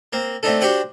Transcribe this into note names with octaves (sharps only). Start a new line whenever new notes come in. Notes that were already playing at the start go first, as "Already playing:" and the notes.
A#3 C4
A3 C4 D4 D#4 A4
D4 F#4 G4 C5 F#5 G5